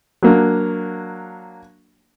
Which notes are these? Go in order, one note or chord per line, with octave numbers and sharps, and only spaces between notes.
F#3 A#3 D4